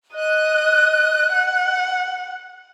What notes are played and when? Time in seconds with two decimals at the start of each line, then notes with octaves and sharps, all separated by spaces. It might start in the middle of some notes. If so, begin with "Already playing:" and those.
0.14 D#5 F#6
1.32 F#5